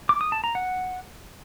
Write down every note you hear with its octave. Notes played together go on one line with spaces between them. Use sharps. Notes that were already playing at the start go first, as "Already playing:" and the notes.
D6
D#6
A5
A#5
F#5